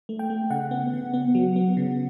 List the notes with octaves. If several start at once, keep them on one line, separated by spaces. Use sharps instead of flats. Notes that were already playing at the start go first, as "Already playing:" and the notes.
A3
G5
A3
C#3 F#5
B3
C#3
B3
F#3
B3
C#3